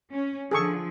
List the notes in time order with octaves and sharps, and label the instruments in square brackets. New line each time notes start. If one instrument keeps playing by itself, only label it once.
[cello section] C#4
[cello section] D3 F3 [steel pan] G#4 A4 C#6